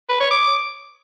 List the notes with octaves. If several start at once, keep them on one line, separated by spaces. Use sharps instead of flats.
B4
C#5
D6